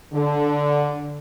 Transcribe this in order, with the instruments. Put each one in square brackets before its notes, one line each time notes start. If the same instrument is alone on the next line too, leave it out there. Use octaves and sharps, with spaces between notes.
[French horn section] D3